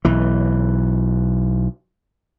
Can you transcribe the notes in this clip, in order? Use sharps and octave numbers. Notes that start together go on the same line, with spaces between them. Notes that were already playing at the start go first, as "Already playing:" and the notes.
B1 E3